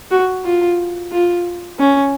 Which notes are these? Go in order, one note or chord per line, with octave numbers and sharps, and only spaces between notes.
F#4
F4
F4
C#4